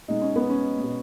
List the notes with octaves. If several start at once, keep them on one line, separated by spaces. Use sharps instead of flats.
B2 G#3 D#4
C#4
B3
C#4
B2 G#3